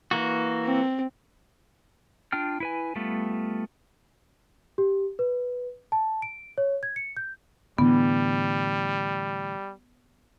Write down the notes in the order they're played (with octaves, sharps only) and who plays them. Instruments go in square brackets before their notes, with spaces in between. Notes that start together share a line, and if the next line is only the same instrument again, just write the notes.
[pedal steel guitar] E3 A#3 F#4
[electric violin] C4
[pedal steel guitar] D4 F4 G5 F6
E4 B4 G#5
G3 A3 B3 F4
[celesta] G4
B4
A5
D7
C#5
G#6
C#7
G6
[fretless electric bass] A2 D3 E3 [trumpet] G3 [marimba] B3